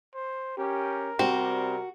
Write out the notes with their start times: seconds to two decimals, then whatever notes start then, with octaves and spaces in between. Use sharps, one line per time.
0.14 C5
0.58 C#4 G4 A#4
1.19 C3 G3 C4 F#4